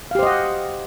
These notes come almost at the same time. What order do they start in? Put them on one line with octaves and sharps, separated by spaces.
F5 G4 C5 D#5 F#5